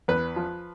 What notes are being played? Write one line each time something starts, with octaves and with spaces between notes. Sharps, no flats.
E2 B4
F3